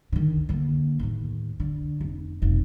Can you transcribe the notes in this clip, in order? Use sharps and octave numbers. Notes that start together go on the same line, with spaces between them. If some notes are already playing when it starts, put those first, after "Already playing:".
D3 D#3
D3 A#3
D#2 A2
D3
F1
F1 B1